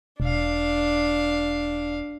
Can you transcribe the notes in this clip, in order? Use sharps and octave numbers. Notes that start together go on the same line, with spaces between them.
E1 D4 F5